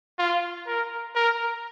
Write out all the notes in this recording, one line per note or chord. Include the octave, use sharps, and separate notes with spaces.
F4
A#4
A#4